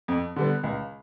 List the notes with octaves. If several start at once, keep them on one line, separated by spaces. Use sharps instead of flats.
F2
D3 G3 B3
C#2